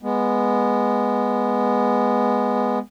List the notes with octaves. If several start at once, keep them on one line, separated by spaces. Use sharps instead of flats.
G#3 B3